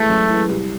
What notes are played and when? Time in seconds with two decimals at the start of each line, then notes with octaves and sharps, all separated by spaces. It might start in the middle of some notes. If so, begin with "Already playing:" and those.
Already playing: E3 G#3 A3
0.09 F#2
0.30 E3 G#3
0.49 C2